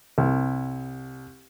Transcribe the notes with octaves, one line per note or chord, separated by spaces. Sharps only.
C2